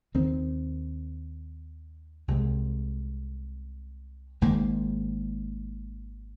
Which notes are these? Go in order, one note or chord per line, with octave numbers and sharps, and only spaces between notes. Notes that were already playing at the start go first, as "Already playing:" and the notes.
D#2 D#3 C4
C2 C3 G#3
G#1 G#2 D#3 A#3